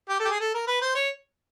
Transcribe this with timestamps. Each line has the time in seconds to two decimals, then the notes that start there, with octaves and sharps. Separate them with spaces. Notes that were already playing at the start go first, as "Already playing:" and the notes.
0.09 G4
0.20 A4
0.25 G4
0.30 G#4
0.40 A4
0.54 A#4
0.67 B4
0.81 C5
0.95 C#5